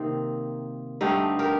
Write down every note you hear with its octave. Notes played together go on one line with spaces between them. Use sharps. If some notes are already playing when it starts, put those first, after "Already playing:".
Already playing: C3 D#3 A#3 C4 D#4
G2 D3 A3 C4 D#4 G4
G4 A#4